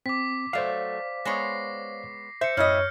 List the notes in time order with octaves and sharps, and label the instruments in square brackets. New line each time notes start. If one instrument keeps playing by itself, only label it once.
[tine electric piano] C4 [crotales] D6 B6
[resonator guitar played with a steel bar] F#3 A3 [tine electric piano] C5 D5 F5
[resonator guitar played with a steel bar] G#3 B3 C#5 [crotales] A#6 C7
[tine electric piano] C5 [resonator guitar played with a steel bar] E5 [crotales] G6 C#7
[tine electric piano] F#2 [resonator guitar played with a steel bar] A2 E4 D#5 [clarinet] C#5 [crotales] F6